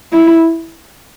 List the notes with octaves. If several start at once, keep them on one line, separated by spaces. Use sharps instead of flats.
E4